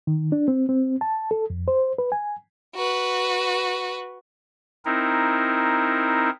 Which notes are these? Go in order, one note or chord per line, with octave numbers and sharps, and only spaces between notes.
D#3
D4
C4
C4
A5
A4
F2
C5
B4
G#5
F#4 B4
C4 D#4 E4 A#4